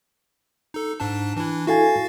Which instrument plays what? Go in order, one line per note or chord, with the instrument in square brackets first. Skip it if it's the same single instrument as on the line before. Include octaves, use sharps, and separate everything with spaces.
[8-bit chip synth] D#4 A4
G#2 D4 A5
E3 D4 E4
[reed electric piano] E4 A4 G#5 [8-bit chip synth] F#4 F5 A6